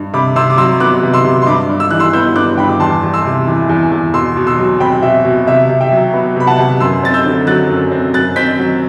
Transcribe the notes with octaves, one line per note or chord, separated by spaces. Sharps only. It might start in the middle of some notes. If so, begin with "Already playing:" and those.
Already playing: G2
C3 B5 D6
C3 C6 E6
D6
F#3 C6 E6
B3 D6 F#6
C3
C6 E6
C3
C6
G2 B5 D6
G2
E6
E3 F#6
C6 E6
B3 E6 G6
G2 D6 F#6
G2 G5 B5
D6
E2 A5 C6
E2
C6 E6
C3
E3
E2
E2
B2 C6 E6
B2
C6 E6
F#3
C4 G5 B5
B2 E5
B2
C3 E5
C3
E5 G5
F#3
B3
C3 B5
F#5 A5
C3
F#2 C6 E6
C4 A6
E6 G6
D3
F#3 F#6 A6
F#2
C4
F#2 F#6 A6
C4 G6 B6
F#3